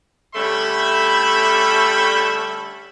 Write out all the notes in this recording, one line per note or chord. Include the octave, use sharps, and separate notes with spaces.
D3 G3 A3 C#4 E5 B5